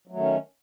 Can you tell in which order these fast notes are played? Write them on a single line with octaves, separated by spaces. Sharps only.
F#3 A3 D#3 C#4